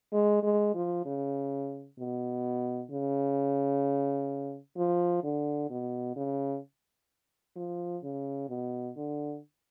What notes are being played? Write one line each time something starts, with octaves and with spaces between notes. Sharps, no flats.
G#3
G#3
F3
C#3
B2
C#3
F3
D3
B2
C#3
F3
C#3
B2
D3